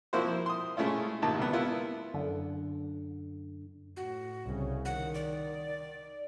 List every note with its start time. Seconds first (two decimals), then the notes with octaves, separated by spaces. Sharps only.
0.13 F3 A#3 C4 E4 F#4 C5
0.46 C6 D#6
0.77 G#3 A3 C#4 E4 F4
1.22 A#1 A#2 D#3 G4 A5
1.39 C#2 B3
1.53 A#3 B3 E4 F4
2.14 F#2 D3
3.97 A2 F#4
4.46 C2 C#3
4.85 D#3 F#5
5.14 D5